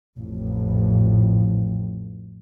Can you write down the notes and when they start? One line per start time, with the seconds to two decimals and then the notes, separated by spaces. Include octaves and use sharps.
0.17 A1 F2